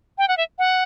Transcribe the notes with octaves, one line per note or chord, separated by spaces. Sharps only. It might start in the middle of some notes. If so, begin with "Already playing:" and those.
G5
F#5
E5
F#5